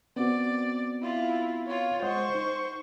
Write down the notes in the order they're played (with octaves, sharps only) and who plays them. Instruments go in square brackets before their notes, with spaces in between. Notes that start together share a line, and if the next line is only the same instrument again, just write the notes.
[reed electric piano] B3 C4 F#4 [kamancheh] D5
[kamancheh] E4 F4
F4 C#5
[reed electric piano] G#3 D#5 F#5 [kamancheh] C5 C#6
[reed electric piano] D#4